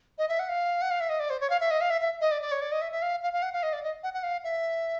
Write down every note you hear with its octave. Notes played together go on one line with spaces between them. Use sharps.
D#5
E5
F#5
F5
F#5
F5
E5
D#5
D5
C5
C#5
F5
E5
D#5
F5
E5
E5
D#5
D5
D5
C#5
D5
D#5
E5
E5
F5
F5
F5
F#5
F5
D#5
D5
D#5
F#5
F#5
F5
E5